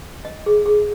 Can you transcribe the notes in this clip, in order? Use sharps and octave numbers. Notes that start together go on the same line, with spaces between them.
D#5
G#4
G#4